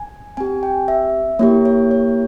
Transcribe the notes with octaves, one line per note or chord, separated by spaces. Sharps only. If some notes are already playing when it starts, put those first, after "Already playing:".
Already playing: G#5
C4 G4 G#5
G5
E5
A#3 E4 G4 C#5
C#5
C#5